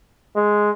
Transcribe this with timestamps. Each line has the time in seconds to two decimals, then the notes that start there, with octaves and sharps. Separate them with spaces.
0.36 G#3